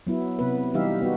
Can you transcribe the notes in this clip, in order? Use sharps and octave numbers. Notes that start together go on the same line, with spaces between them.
F#3 B3 E4
C3 B3 B4
E3 G3 D#4 G4 E5 F5
B3 D#4 F#4